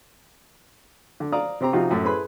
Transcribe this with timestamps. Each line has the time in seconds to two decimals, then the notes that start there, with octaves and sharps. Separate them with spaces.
1.20 D3
1.32 D5 F5 A#5 D#6
1.61 C3 C4 G4 A#5
1.73 C3 F3 D#4 F4 F#4
1.91 F#2 A2 A3
2.04 E4 G#4 A4 B4 B5 C6